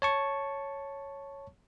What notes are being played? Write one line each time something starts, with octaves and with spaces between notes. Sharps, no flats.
C#5 A5 C#6